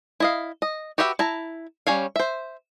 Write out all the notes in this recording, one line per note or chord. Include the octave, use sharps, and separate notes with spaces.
E4 D#5 F5
D#5
F#4 G4 B4 E5 G5
E4 A5 A#5
G3 C#4 C#5 F5
C5 E5